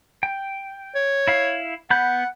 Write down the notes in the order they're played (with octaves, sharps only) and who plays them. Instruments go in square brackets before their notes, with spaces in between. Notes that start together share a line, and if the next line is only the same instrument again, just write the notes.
[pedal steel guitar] G5
[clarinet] C#5
[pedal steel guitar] E4 F5
[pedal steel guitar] B3 B5 G6 [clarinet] F#5